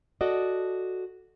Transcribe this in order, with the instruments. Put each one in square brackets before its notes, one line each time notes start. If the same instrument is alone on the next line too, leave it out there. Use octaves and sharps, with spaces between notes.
[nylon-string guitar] F#4 A4 D5 D#5